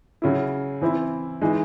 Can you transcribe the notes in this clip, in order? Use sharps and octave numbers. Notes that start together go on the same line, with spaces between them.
C#3 F#3 C#4 E4
E3 C4 E4
E3 G#3 D#4